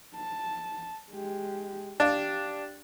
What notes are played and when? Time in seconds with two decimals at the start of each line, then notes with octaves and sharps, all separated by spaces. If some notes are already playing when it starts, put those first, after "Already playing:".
0.16 A5
1.11 G#3 G4
2.00 D4 G4 F5